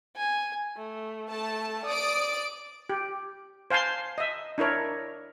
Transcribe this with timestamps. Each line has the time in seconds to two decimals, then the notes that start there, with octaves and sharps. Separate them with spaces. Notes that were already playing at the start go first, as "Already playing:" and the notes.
0.16 G#5
0.76 A3
1.30 A3 A5
1.86 D5 D#6 D7
2.89 G4
3.70 C5 F5 G#5 A5 C6
4.18 D#5 E5
4.58 D4 E4 A#4 C#5